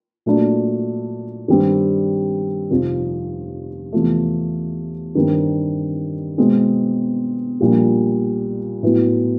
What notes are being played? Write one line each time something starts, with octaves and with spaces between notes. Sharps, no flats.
A#2 F#3 A3 D4
G2 D#3 G3 C4
F1 F2 C3 F3
E2 C3 F3 A3
G2 D#3 G3 C4
B2 G#3 C4
A#1 A#2 G3
A2 F#3 B3 E4